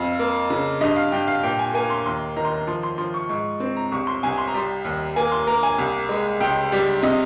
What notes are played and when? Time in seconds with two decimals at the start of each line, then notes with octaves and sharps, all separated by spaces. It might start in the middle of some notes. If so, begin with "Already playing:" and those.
Already playing: F2 F5
0.19 A#3
0.50 C#3
0.81 G2 D#5
0.96 F5
1.12 G2 G5
1.28 F5
1.43 A#2 G5
1.59 G#5
1.74 A#3 G#5
1.90 C6
2.05 D#2 C6
2.36 D#3 A#5
2.45 C6
2.54 A#5
2.67 F3 C6
2.83 C6
2.98 F3 C6
3.14 C#6
3.29 G#2 C#6
3.60 C4
3.76 A#5
3.92 C2 C#6
4.07 C6
4.23 C2 G#5
4.38 C6
4.48 A#5
4.54 G3 C6
4.85 D#2
5.16 A#3 G#5
5.32 C6
5.47 A#3 A#5
5.63 G#5
5.78 C2
6.09 G#3
6.41 C#2 G5
6.72 G3
7.03 C3 D#5